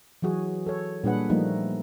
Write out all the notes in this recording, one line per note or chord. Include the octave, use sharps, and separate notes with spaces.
E3 F#3 F#4 G#4
A4 C#5
A#2 G3 D4 G#4 B4 F#5
F3 G3 A3 A#3 D#4